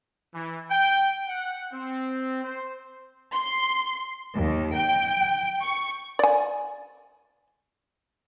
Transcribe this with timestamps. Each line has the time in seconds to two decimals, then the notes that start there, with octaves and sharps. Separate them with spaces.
0.34 E3
0.71 G5
1.28 F#5
1.72 C4
2.44 C5
3.33 C6
4.35 D#2
4.75 G5
5.61 C#6
6.19 D5 G#5